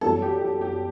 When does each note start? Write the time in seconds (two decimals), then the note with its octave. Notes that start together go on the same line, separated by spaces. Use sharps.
0.01 F#2 E3 G3 B3 A4
0.22 G4
0.41 G4
0.61 G4